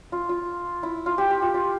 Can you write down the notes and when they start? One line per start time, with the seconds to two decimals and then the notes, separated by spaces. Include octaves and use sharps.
0.12 F4
0.29 F4
0.83 E4
1.06 F4
1.18 G4
1.30 G4
1.42 F4
1.54 F4